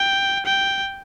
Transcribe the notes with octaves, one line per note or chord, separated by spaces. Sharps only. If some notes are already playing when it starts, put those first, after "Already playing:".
Already playing: G5
G5